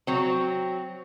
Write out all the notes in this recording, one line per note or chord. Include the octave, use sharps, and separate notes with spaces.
F#3 C4